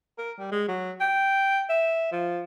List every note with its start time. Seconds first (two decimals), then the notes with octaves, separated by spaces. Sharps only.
0.18 A#4
0.38 G3
0.52 G#3
0.68 F#3
1.00 G5
1.69 E5
2.12 F3